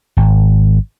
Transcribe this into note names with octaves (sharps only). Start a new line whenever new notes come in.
G#1